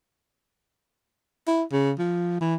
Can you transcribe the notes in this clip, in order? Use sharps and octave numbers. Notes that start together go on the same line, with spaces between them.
E4
C#3
F3
E3